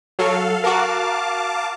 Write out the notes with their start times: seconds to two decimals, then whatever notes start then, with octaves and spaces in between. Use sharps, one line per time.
0.19 F#3 A4 F5
0.64 F#4 A#4 F5 A5 D6